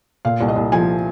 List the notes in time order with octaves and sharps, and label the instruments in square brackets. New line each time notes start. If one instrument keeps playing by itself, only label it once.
[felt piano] A#2 F5
C2
D#5
C2
F3 G#5